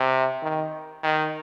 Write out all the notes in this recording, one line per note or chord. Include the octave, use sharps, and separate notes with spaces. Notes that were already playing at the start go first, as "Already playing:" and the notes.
Already playing: C3
D#3
D#3